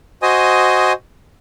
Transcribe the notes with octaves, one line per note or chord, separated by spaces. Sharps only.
F#4 C5 D#5 G#5 D#6